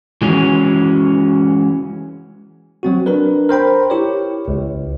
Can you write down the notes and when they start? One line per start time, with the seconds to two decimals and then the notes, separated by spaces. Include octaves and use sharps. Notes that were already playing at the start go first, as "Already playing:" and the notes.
0.22 E3 G#3 C#4 F#4
2.83 F#3 C4 F#4
3.06 D4 A#4 B4
3.49 A#4 C5 G5 B5
3.90 E4 G4 C#5
4.48 C#2